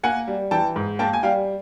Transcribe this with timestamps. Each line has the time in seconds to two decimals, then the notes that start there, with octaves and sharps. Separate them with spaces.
0.04 A#3 F#5 G#5
0.28 G3
0.51 E3 G5 A5
0.76 G#2
0.99 A#3 G5 A5
1.13 G#5
1.23 G3 F5 G5